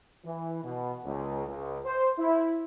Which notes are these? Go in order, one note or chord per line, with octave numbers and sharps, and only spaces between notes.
E3
B2
C#2
C#2
C5
E4